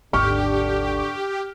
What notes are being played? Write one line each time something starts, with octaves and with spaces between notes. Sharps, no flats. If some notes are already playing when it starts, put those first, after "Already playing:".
G#1 D#2 D3 D4 G4 C#6 F6